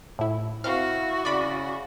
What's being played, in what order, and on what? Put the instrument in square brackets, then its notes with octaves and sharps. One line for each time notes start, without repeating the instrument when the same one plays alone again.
[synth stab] A2 E4
[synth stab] C4 F5 [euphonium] E4 [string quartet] F#4
[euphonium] C#3 [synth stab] D5 B5